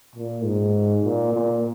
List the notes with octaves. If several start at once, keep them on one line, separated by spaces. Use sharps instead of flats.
A#2
G#2
A#2
A#2